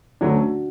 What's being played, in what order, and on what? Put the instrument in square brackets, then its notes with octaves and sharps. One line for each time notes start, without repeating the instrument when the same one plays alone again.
[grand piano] D2 D3 F#3 A3 C#4 [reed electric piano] D4 F#4